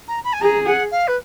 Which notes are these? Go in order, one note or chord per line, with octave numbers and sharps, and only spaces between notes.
A#5
B5
G#5
G#4 A#5
F#5
F5
B4